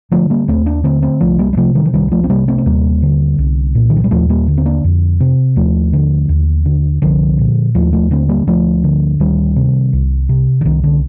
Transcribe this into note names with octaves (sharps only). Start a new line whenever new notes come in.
D3 F3 A3
G3 A#3
D#2 A3 C4
A#3 D4
D3 A3 C4
A3 C4
C2 F3 A3
G3 A#3
G3
C3 F3 A3
D#3 G3
F3
C2 D#3 G3
F3 A3
C4
C3 G3 A#3
A3 C4
C4
D#2 G3 A#3
D3
C2
A#2
D#3
F3
G3
D#2 F3 A3
G3 A#3
D3
C4
A#3 D4
F2
C3
D#2 F3 A3
D3
D#2
D3
C2 D3 F3
A#2
D#2 F3 A3
F3 A3
D3 A3 C4
G3 A#3
D2 F3 A3
D3
D2 D#3 G3
C3
C2
C3
D3
C2 D#3
D3